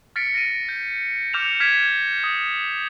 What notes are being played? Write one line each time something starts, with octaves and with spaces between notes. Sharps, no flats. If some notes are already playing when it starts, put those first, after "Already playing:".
F6 A6 B6 C#7 D7
A#6 D7 D#7
G6
D6 F6 G6 C#7 E7 F7
F6 G#6 B6 D7 E7
D#6